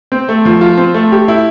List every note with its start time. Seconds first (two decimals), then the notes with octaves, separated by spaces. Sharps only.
0.12 C4
0.29 A3
0.45 F3
0.61 F4
0.78 C4
0.94 A3
1.12 G4
1.28 E4